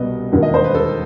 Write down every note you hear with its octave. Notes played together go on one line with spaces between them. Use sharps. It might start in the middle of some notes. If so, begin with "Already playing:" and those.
Already playing: C2 B2 G3 B4 D#5
E1 D#2 D#3
D#5
C5
B4
A4